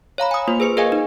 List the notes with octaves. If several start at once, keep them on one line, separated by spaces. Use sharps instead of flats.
C#5 F5 A#5 B5
G#5 D#6
A#3 F4 C5
G#4 B4 C5 C#7
G#4 A#4 D#5 F5 G#5
D#4